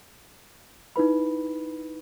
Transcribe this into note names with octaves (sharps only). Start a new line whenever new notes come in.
D#4 E4 B4 B5